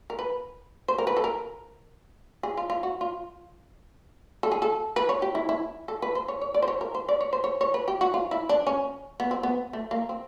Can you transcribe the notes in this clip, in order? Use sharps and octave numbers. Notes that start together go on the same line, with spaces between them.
A#4
B4
C5
A#4
B4
A4
A#4
G#4
F4
F4
F#4
F4
A4
G#4
A4
B4
C#5
G4
E4
E4
A4
B4
C5
C#5
C#5
D5
C5
C#5
A#4
C5
D5
C#5
C5
C#5
C#5
B4
G4
F#4
F4
E4
D4
C#4
B3
C4
B3
A3
A#3
C4